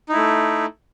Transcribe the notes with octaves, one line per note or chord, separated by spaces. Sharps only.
A3 D#4 E4